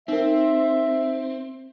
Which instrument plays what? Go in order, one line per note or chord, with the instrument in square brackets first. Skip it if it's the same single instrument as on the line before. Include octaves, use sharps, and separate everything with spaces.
[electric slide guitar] C4 [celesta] D#4 A#4 [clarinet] E5